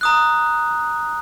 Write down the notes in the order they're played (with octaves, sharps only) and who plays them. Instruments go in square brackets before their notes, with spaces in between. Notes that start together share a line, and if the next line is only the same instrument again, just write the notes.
[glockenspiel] A#5 D#6 F#6